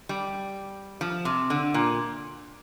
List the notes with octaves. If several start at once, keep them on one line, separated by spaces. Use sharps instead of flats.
G3
F3
C3
D3
A#2